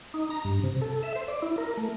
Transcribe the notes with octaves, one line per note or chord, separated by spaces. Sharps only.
D#4
A#5
G2
C3
A4
E5
C5
D5
E4
A#4
A3